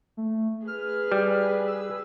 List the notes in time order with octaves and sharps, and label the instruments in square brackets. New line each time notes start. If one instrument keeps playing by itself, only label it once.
[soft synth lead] A3
[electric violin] G#4 B4 [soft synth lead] F6
[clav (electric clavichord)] G3
[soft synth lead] E6